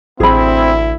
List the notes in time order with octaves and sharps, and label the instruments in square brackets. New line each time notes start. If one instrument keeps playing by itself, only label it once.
[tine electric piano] A1 [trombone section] D2 E4 [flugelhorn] C4 [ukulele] G#4 B5